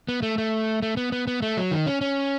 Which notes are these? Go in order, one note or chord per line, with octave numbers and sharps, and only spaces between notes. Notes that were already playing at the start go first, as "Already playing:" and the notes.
B3
A3
A3
A3
B3
B3
B3
A3
F#3
D#3
C#4
C#4